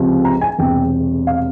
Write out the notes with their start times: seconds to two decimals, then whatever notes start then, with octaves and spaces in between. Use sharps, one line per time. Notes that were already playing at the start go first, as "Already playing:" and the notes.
Already playing: C#2 C3 F3
0.25 A#5
0.41 G#5
0.58 E1 E2 C3 G5
1.27 F5